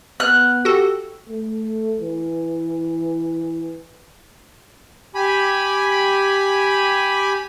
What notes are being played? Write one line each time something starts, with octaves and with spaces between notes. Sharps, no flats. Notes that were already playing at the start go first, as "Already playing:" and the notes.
B3 F6 F#6
F#4 G4 A4
A3
E3
G4 G#5 B5